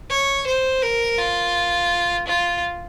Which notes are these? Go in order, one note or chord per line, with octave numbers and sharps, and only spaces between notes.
C#5
C5
A#4
F4
F4